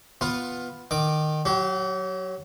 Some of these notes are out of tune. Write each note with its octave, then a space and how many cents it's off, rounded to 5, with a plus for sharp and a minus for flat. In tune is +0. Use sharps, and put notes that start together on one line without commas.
B3 +0 F4 +10
D#3 -20 D6 +0
F#3 +0 G4 -40